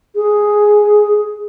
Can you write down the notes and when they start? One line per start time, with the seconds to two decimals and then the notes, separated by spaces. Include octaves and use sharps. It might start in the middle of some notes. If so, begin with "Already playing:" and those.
0.16 G#4